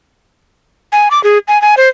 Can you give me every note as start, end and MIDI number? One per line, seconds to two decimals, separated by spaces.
0.92 1.08 80
1.11 1.22 86
1.24 1.38 68
1.48 1.61 80
1.61 1.75 80
1.77 1.89 72